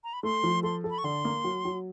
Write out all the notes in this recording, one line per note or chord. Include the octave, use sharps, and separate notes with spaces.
A#5
B5
A3 C6
F3
A4 C6
A4
B5
C#6
D3 C6
A#3
F#3
F#3